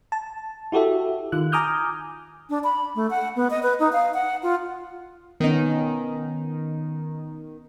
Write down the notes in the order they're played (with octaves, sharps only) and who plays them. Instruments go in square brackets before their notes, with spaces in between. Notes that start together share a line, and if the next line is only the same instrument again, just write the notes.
[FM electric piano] A5
E4 F#4 G4 A4 E5
D#3 F4 F#6
G#5 A#5 D6 D#6 F6 G6
[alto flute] D4
B5
A3
F#5
B3
D#5
B4
D#4
F5
F#5
F4
[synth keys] D#3 D#4 [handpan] B3 C#4